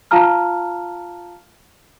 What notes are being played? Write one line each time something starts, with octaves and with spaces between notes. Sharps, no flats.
F4 F5 A5 A#5 F6